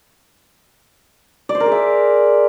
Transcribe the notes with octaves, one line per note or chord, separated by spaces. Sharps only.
D5
C5
A#4
G#4
E5